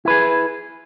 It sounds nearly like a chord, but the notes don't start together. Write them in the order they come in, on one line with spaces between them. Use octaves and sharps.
E4 B4 G#4